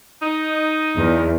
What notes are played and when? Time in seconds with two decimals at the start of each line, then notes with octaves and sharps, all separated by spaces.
0.21 D#4
0.96 E2